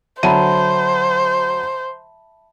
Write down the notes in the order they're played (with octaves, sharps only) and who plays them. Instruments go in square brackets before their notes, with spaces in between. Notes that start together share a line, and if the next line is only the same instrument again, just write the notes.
[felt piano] D3 F#3 D#7 [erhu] C5 [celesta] E5 A5 B5